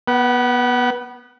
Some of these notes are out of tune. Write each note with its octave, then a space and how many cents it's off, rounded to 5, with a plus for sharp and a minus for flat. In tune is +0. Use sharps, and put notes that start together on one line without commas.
B3 -20 F#5 +30